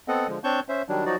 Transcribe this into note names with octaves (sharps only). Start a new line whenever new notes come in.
B3 C4 A4 D#5 F#5
D3 F3 G#3
C4 D4 C#5 A5 C#6 G6
C#4 C5 E5
D#3 F#3 G3 D4
F3 F#3 D#4 F#4 D5